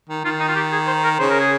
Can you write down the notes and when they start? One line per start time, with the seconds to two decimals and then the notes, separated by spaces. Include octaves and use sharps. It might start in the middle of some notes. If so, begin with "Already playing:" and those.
0.09 D#3
0.25 D#3 F4
0.40 D#4
0.48 F4
0.55 G4
0.72 G#4
0.87 C5
1.04 A#4
1.18 C#3 C5
1.30 A#4
1.40 G#4